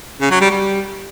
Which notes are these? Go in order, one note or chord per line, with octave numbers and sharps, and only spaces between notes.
C#3
F#3
G3
G3